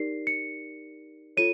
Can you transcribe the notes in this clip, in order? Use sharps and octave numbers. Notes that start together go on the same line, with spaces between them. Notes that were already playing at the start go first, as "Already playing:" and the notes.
Already playing: D#4 G4 A#4 D5 C7
C#7
F4 A4 C#5 D#7